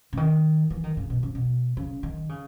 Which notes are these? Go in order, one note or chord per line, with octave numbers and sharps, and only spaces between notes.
C#3
D#3
E3
D#3
C#3
B2
C#3
B2
C#3
D#3
C#3